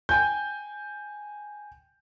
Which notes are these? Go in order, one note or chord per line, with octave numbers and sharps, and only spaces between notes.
G5 G#5 G6